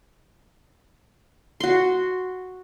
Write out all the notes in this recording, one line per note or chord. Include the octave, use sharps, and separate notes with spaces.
F#4 C6